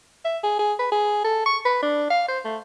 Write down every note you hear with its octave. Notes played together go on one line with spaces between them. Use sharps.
E5
G#4
G#4
B4
G#4
A4
C#6
B4
D4
F5
C5
A3